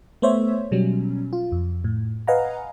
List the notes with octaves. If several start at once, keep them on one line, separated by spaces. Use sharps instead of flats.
A3 B3 C5 C#5 E5
B2 F#3 G3 C#4
F4
F2
A2
B4 D#5 F5 F#5 G#5 A#5